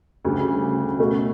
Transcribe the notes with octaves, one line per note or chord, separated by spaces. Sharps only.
D2 C#3 G3
B2 A3 C#4 F#4